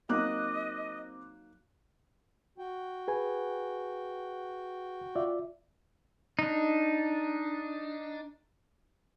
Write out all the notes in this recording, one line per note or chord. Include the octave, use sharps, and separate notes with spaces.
F#3 A#3 C4 D#4 D#5 D6 F#6
F#4 G5
G#4 B4 G#5
F4 D5 E5
D4 D#4